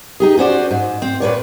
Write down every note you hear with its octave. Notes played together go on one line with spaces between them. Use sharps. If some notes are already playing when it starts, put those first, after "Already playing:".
D#4 G4 G#4
C#4 F#4 C5 D5
G#2
C4
A#2 B4 C#5 D5